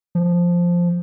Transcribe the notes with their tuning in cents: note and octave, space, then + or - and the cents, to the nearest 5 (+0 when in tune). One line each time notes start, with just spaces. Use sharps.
F3 +0